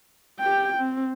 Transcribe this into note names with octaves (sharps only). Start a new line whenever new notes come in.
G4 G5
C4